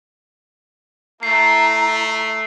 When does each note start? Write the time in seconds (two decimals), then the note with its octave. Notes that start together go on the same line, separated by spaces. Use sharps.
1.23 A3 E4 A#5 C7